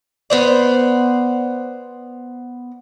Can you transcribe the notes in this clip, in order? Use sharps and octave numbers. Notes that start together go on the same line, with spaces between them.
B3 C5 D5